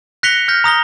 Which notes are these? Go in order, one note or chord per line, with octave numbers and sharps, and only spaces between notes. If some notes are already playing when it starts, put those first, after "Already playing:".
F#6 A#6 B6 C#7 F7 G7
F6 G6 A#6
A#5 D#6 A#6 G7